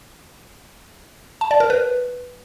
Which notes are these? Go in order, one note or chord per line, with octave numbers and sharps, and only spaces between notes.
A5
D5
A#4
B4